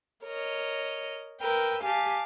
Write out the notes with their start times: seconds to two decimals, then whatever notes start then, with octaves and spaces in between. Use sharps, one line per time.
0.25 A#4 C#5 D#5
1.42 A#4 B4 G5 E6
1.83 G4 F5 G#5 A5